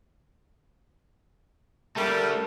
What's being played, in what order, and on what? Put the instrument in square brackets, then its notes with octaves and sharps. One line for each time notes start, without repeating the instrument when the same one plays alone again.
[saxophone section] G3 [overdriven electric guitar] A3 D4 [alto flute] A#4 [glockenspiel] A5